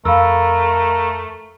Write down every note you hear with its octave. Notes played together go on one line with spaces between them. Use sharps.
F2 A3 A#4 F5 B5 E6